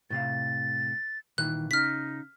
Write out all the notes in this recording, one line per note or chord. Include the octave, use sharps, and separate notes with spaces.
A2 C3 F5 A6
A#2 D#3 E3 F#6
C#3 D#4 F6 B6